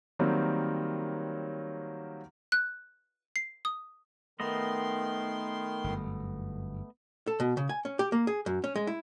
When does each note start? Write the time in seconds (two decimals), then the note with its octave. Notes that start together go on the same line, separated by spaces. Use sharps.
0.19 D#3 F#3 G3 A#3 C4
2.52 F#6
3.36 C7
3.65 D#6
4.40 D#3 A3 B3 D#5 C6
5.84 G1 F#2
7.27 A4
7.40 B2
7.57 C#3
7.69 G#5
7.85 C#4
7.99 G4
8.12 A#3
8.27 G#4
8.46 F#2
8.64 C#4
8.76 G#3
8.87 E4